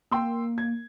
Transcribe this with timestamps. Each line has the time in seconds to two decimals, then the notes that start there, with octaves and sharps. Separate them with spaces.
0.11 A#3 G5 C6 E6
0.58 G#6